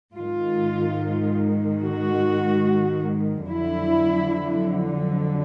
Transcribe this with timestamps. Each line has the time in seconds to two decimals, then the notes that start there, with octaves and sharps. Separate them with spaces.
0.15 G#2 D#3 G#3 F4
1.82 F#4
3.49 F2 D3 F#3 E4